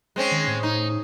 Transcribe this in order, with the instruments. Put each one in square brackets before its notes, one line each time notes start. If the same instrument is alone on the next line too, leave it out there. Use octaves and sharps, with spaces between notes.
[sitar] G#3 C4 C#4
[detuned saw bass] D#3
A2
[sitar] D#4